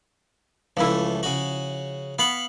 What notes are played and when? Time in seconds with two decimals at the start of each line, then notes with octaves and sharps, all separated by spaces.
0.77 C#2 E3 F3 A3 E4
1.23 C#3 F#4
2.19 B3 F5 B5 C#6